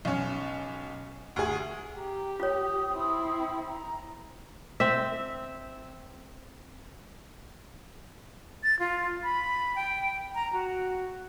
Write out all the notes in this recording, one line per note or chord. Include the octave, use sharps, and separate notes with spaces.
B1 C#4
D2 G#4
G4 A#5
F4 C#5 D#6
C4 E4
A#5
C4 E5
A6
F4
B5
G5
A#5
F#4